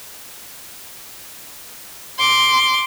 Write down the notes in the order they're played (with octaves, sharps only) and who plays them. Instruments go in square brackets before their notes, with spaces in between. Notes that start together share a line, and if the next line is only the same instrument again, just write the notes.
[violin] C6 D6